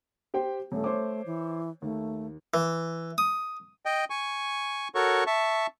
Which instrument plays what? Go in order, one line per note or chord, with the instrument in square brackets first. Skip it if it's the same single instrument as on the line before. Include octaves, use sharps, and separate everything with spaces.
[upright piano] G4 C5 G5
[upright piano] D#1 [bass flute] A3
[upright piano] C5 C#5 D6
[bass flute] E3
[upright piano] D#2 [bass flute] A3
[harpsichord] E3
D#6
[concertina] D#5 G5
G#5 C#6
F#4 A4 A#4 C#5 C#6
E5 A5 C#6